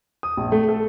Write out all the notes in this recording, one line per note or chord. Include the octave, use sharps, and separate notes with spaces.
D#6
A#1
A3
A4